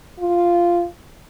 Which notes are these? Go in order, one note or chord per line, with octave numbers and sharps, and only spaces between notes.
F4